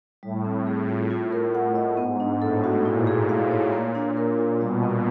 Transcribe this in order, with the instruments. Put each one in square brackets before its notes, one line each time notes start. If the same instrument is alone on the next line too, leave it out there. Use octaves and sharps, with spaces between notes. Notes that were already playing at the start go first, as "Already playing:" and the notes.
[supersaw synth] A2 [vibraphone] G3
[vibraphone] C4
G#4
F4
F4
A#4
F#5
D#5
[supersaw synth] G#2 [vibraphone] B3
[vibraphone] D4
[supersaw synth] A2 [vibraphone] A4
[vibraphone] F#4
[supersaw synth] A#2 [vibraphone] E4
[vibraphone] G#4
F5
C#5
A#3
D4
A#4
F4
[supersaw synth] B2 [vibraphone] G3
[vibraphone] B3